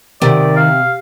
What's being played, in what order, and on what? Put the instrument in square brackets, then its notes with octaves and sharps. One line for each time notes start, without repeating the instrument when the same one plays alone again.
[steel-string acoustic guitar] C3 [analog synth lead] D#3 [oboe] D5
[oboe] F5